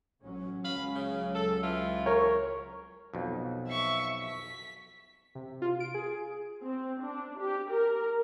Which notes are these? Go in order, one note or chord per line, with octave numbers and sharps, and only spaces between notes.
A1 F#3 C#4
C#2 F#3 C#4 F5 B5
C#3
A4
E3 F4
A#4 C#5 C#6
B1 F2
E5 C#6
B6
C3
F4
D7
G#4
C4
D4
G4
A#4